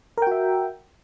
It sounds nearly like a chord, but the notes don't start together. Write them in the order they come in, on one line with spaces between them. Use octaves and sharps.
A#4 G5 F#4 E5